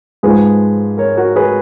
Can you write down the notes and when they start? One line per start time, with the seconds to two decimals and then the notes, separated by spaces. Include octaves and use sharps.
0.23 G#2 F3 G#3 G#4 B4
0.98 A#4 C#5
1.17 F#4 A#4
1.36 G#4 B4